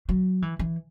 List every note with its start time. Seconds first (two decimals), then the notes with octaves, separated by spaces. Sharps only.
0.09 F#3
0.42 E3
0.59 E3